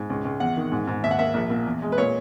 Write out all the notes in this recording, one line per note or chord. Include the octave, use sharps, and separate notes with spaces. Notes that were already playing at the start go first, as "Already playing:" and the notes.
Already playing: G#2
C#2
C#2
E2 F#5
D#3
G#2
G#2
D#2 E5
F#5
A#3 E5
A#1
A#2
E2
G#3
B4
A#2 C#5